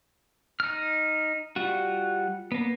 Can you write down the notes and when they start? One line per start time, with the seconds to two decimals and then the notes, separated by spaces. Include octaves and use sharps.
0.60 D#4 F6
1.56 G3 F4 F#4
2.52 A#3 B3